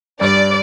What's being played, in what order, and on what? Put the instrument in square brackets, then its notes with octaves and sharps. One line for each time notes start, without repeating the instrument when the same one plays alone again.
[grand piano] G2 [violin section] D5